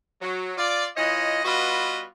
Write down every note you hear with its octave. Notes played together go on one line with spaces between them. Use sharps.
F#3
F4 D5
E3 F4 C#5 D#5
G3 B3 F4 F#4 B4 D#5